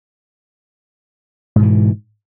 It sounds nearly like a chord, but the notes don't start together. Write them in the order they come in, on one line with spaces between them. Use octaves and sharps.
G#2 B2 E3